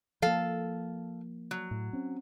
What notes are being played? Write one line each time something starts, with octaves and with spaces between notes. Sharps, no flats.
F3 A#3 A4 F5
F#3
A2
C4 C#4